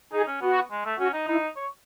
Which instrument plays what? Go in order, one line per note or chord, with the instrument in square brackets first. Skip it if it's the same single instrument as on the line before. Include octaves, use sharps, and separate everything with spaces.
[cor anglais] D#4 [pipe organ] G#4
[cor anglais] C#4
[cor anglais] B3 [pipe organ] F#4
[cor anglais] G#3
A3
[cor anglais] C#4 [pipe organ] F#4
[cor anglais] D#4
[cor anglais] D#4 [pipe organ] E4
[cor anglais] C#5